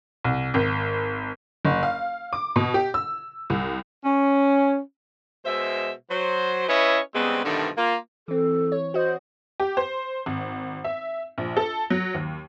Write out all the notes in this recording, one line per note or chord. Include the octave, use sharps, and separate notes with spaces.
C2
G#1
F#1
F5
D6
B2
G4
E6
C2
C#4
B2 G#3 C5 E5
F#3 C5
C#4 E4 B4 C#5 D#5 E5
C#3 G3 G#3 B3 C4
G2 B2 D3 D#3 F3 A3
A#3 F4
E3 C4 A4
C#5
F#4 C5 D#5
G4
C5
G#1
E5
A#1
A4
F#3
D#2